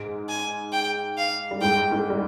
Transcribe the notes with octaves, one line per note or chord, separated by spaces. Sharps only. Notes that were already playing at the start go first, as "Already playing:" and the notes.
Already playing: G#2 G#3
G#5
G5
F5
G3
G#2 G#3 G5
G#2 G#3
G3